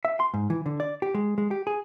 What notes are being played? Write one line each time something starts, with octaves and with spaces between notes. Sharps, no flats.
E5
C6
G#2
E3
D3
D5
G4
G#3
G#3
G4
G#4